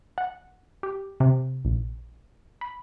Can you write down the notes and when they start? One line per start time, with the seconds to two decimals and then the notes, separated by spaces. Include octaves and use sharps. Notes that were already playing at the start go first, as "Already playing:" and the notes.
0.18 F#5
0.83 G4
1.20 C3
1.65 A#1
2.61 B5